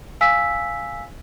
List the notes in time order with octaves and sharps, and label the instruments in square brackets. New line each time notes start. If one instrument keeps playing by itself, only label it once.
[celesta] F5 G#5 E6 B6